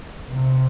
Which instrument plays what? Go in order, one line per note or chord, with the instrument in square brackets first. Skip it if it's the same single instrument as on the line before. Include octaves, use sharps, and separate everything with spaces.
[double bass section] C3